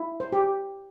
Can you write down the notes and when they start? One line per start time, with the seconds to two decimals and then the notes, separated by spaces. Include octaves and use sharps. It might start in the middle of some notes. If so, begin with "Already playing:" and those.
Already playing: E4
0.20 C5
0.32 G4